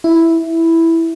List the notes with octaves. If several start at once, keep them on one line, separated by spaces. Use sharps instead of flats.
E4